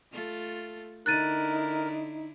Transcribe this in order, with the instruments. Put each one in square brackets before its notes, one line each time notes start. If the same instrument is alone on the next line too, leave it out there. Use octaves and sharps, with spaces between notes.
[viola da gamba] A3 F4 A4
[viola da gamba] D3 E4 [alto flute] D#4 [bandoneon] A#4 [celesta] F#6 A6 D#7